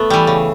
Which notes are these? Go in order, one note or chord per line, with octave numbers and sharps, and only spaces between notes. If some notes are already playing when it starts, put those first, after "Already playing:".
Already playing: A3 B3
E3 G3
C#3